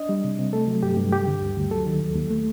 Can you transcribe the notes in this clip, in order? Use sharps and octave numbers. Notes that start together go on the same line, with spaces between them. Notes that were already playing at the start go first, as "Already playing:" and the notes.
Already playing: D4 D#5
G3
C3
C3
A3 A4
F#3
G2 G4
G2
G3 G4
D3
D2
D2
F#3 A4
D#3
D#2
D#2
A3